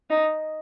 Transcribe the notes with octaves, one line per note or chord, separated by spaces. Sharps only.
D#4